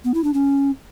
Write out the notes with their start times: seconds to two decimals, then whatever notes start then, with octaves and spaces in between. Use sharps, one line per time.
0.04 B3
0.14 E4
0.24 D4
0.34 C#4